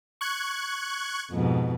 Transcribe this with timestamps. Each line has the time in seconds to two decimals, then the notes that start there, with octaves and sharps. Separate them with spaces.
0.21 C#6 F#6 G#6
1.31 F2 G#2 B2